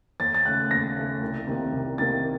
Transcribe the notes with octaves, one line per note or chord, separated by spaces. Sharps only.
D#2 A6
A6
C#3 A3 F#6
D#2 A#6
C#3 A3
C2
C3 D#3 A#3
C2
C3 D#3 A#3 A6